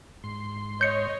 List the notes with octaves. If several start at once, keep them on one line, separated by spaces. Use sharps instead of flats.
G#2 C6
C#5 D#5 G6 C#7